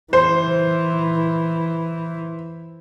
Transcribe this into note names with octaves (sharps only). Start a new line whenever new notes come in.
E3 C5